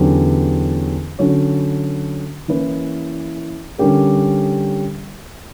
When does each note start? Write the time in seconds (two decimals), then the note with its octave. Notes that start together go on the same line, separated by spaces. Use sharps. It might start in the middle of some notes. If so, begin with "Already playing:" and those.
Already playing: E2 D3 F#3 C#4 G4
1.19 D3 F#3 C#4 F#4 C#5
2.48 E3 A#3 C#4 E4 B4
3.78 D3 G3 C#4 G4 A#4